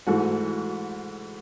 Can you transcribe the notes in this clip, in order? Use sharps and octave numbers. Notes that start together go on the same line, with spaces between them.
G#2 E3 A3 F#4